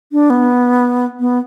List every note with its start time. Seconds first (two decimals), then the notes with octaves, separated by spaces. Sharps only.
0.12 D4
0.30 B3
1.20 B3